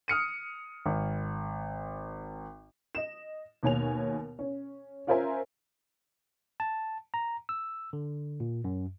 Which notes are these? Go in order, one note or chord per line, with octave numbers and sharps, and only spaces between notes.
D#6 F6 C#7 D#7
G#1
D#5 E7
D#2 B2 C#5 G#5 F7
C#4
C#4 F4 A#4 C5 E5 G#5
A5
A#5
E6
D3
A#2
F#2